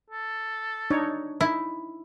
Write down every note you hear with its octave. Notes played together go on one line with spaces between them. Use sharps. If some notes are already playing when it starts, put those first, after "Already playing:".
A4
D4 D#4 C#5
D#4 E4